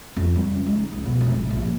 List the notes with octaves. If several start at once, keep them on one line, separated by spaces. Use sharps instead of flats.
F2
G3
C#2
G#3
D#4
C#2
B2
F1
G#1
A#1
A#2